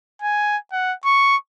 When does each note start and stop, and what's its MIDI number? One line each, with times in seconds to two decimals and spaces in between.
0.22 0.57 80
0.72 0.94 78
1.05 1.36 85